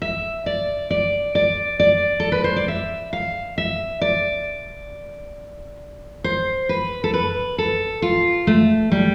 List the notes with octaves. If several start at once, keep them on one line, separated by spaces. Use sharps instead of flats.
E5
D5
D5
D5
D5
A4
B4
C5
D5
E5
F5
E5
D5
C5
B4
A4
B4
A4
F4
A3
G3